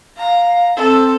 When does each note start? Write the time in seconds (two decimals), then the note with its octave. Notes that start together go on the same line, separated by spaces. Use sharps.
0.17 F5 A#5
0.77 C4 A4